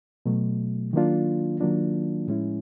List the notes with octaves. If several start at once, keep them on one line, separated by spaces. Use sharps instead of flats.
B2 F#3 A3
D#3 F#3 A#3 D4 F4
D#3 F#3 A#3 D4 F4
A2 F3 G#3 C#4 E4